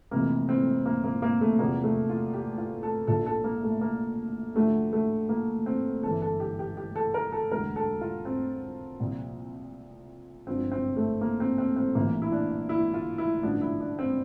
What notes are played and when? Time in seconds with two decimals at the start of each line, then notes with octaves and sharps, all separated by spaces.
0.11 F1 F2 C3 E3 A#3
0.49 C4
0.86 A#3
1.04 A#3
1.22 A#3
1.41 A3
1.59 E2 C3 F3 A#3
1.84 A3
2.09 F4
2.34 G4
2.58 F4
2.83 A4
3.07 A#1 A#2 F3 A4
3.26 A4
3.44 A#3
3.63 A3
3.81 A#3
4.55 D2 D3 F3 A3
4.93 A3
5.29 A#3
5.66 C4
6.03 G1 G2 E3 A4
6.22 A4
6.40 G4
6.59 G4
6.77 G4
6.95 A4
7.14 A#4
7.32 A4
7.51 E1 D2 D3 A#4
7.76 A4
8.01 F4
8.25 C4
9.00 C2 A#2 F3
10.47 G1 G2 D3 F3 C4
10.72 C4
10.97 A3
11.21 A#3
11.40 C4
11.58 C4
11.76 C4
11.95 A#1 A2 E3 A#3
12.22 E4
12.32 D4
12.69 E4
12.94 F4
13.18 E4
13.43 A1 G2 D3 F3 D4
13.61 E4
13.80 D4
13.99 C4